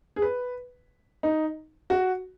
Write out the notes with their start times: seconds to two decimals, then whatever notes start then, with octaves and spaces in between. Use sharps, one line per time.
0.16 G#4
0.22 B4
1.23 D#4
1.90 F#4